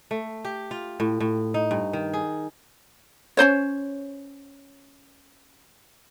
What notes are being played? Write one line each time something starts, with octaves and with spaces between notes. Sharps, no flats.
A3
G4
F4
A2
A2
D#4
G2
D#3
G#4
C#4 D4 C5 C#5